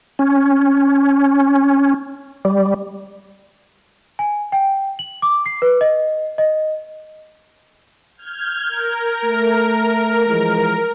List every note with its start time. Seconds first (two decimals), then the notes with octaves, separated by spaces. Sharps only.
0.19 C#4
2.45 G3
4.19 G#5
4.52 G5
4.99 F#7
5.22 D6
5.46 C7
5.62 B4
5.81 D#5
6.38 D#5
8.17 F6 G6 G#6
8.69 A#4
9.24 A3
10.28 E3 F3 G#3